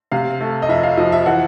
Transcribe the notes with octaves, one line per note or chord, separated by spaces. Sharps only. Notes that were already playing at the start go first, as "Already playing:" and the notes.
C3 F5
A3
D#5
F2 E5
F5
F3 D#5
E5
E3 F#5